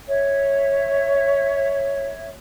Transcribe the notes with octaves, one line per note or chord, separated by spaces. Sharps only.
C#5 E5